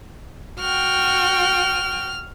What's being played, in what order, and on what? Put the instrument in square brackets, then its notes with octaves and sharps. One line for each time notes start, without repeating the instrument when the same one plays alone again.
[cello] F#4 G5 [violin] F6